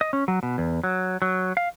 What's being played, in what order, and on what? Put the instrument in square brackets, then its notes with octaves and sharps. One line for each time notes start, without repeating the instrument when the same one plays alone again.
[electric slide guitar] D#5
C#4
F#3
B2
E2
F#3
F#3
F5